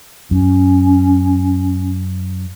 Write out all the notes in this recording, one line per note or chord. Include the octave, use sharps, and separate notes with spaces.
F#2 C#4